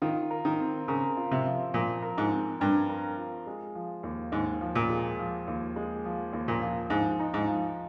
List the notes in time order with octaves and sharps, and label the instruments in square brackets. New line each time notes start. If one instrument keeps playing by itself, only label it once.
[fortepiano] D#3 [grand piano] F4
[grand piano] A#4
[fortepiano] D#3
[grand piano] C4
[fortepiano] C#3 [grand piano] A#4
[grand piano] F4
[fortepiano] C3
[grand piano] F3
[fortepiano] A#2 [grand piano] F3
[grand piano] A#4
[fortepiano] G#2
[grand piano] C4
[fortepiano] G2 [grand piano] A#4
[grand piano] A#4
F4
G#3
F3
D#2
[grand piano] D#2 [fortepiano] G#2
[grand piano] F3
[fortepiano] A#2
[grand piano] G#3
F3
D#2
G#3
F3
D#2
[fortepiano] A#2
[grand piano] F3
[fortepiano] G#2 [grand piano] F3
[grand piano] D#4
[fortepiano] G#2
[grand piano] F3